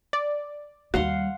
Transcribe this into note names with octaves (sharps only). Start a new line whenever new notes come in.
D5
D#2 G3 F#4 F5 F#5 C6